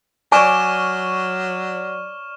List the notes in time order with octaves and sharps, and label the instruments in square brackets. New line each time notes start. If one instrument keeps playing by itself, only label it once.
[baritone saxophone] F#3 [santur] C#5 D5 [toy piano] G#5 [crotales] C#6 F6 E7